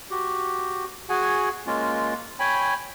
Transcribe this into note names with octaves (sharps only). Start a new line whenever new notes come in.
F#4 G4
F#4 G#4 F#5 G#5
G#3 A#3 C#4 F4
C#5 G5 G#5 B5